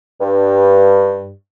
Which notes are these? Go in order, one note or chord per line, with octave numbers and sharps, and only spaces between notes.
G2